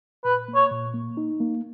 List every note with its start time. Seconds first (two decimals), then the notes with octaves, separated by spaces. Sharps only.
0.24 A#2 B4
0.48 A#3
0.55 C#5
0.71 A#2
0.94 A#3
1.17 D#4
1.40 A#3